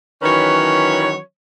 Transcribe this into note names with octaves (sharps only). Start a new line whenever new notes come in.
D#3 E3 F#3 C#4 B4 C#5